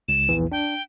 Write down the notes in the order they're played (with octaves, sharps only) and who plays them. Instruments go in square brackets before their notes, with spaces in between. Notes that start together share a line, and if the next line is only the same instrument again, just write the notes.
[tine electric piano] C#2 [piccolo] E7
[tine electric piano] A#1 E2 E3
[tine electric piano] D4 [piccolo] G5